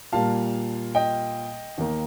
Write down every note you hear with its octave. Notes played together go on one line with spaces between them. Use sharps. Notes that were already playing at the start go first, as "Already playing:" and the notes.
A#2 G3 A#3 F5 A5
D#5 G5
D#2 D#3 A#3